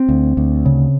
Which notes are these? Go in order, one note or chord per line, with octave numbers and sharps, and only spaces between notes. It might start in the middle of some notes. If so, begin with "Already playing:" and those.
Already playing: C4
D2
D2
C#3